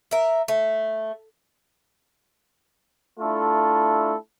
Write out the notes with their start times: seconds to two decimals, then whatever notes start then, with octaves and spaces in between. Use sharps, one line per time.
0.11 A#4 E5
0.48 A3
3.19 A3 D4 E4 F4 A4